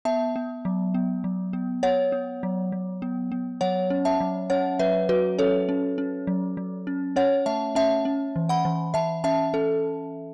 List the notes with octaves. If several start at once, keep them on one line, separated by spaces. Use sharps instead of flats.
B3 E5 A5
B3
F#3
B3
F#3
B3
B3 C#5 F#5
B3
F#3
F#3
B3
B3
F#3 C#5 F#5
C#4
E5 A5
F#3
C#4 C#5 F#5
F#3 B4 E5
F#3 F#4 B4
C#4 A4 C#5
C#4
C#4
F#3
F#3
C#4
C#4 C#5 F#5
A3 E5 A5
C#4 E5 A5
C#4
E3
F#5 B5
E3
E3 E5 A5
C#4 E5 A5
C#4 A4